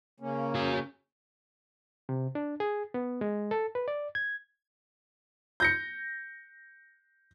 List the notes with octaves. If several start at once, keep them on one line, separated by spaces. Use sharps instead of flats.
C#3 A#3 C#4
F#4 G#5
C3
D4
G#4
B3
G#3
A4
B4
D5
G#6
G6 A#6 C#7